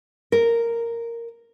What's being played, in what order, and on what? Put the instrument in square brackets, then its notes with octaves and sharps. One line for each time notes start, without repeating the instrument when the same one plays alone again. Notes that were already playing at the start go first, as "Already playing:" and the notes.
[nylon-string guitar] A#4